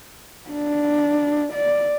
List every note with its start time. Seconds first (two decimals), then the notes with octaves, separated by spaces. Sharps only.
0.50 D4
1.53 D5